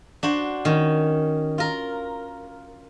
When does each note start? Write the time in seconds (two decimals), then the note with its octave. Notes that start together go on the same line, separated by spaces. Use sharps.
0.23 D4 F#4 C5
0.65 D#3 C#4
1.58 F4 A#4